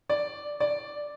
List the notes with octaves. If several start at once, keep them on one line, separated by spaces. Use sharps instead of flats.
D5
D5